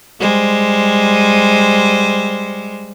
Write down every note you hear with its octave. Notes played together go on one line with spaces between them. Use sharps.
G3 G#3 C5